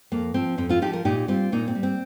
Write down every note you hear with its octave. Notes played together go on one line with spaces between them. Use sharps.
F2 A#3
F3 C4
F2 C4
C4 F4
F3 D#4 G4
F4 A#4
A#2 D#4 G4
G3 C4 F4
A#2 A#3 D#4
C4
G3
C4